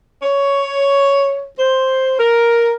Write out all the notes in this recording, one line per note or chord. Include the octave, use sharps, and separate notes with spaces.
C#5
C5
A#4